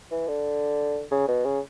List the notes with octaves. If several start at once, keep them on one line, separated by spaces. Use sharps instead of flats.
E3
D3
C#3
B2
C#3